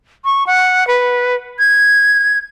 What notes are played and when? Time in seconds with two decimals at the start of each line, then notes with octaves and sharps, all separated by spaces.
0.25 C#6
0.46 F#5
0.87 B4
1.59 G#6